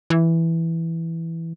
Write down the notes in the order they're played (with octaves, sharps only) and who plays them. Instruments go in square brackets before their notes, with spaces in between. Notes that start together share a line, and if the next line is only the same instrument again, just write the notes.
[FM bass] E3